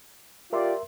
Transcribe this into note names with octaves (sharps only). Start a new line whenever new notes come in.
F4 G4 A#4 D5 E5 C6